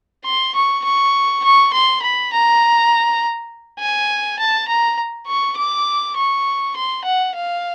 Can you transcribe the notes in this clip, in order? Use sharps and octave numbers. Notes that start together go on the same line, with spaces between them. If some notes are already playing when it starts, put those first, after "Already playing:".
C6
C#6
C#6
C#6
C6
B5
A#5
G#5
A5
A#5
C#6
D6
C#6
C6
F#5
F5